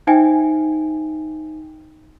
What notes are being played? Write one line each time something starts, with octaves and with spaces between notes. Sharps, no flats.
D#4 C5 E5 G5 G#5